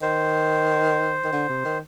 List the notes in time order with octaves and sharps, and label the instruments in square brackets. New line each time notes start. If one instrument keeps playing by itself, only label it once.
[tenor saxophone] D#3 [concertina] C5
[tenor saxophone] D#3
D3
C3
D#3